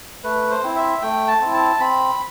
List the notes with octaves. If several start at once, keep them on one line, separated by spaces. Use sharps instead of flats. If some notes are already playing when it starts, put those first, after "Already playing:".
A3 B4
C5
C4 E4
E5
A3 G5
A5
C4 E4
A5
C4 B5